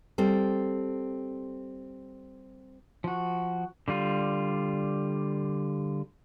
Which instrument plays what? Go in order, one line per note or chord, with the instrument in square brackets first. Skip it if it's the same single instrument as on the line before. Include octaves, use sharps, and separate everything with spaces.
[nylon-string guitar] G3 C4 A4 C5
[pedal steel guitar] F3 F#4
D3 G3 F4